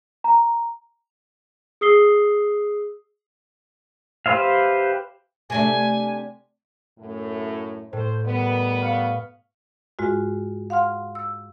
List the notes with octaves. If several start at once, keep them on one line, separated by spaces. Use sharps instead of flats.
A#5
G#4 D#6 E6 C7 G7
G4 B4 C5 E5 F5
C3 A3 D4 G#5
F#2 A2
A2 C5
D#3 G3 B3
F5 C#6
G#2 G#3 F4 F#4
F5 F#5 C6 F6
E6